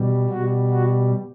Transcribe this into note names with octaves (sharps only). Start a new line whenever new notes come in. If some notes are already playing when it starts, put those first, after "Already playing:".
Already playing: B2 G3
B2 G3 F#4
F#4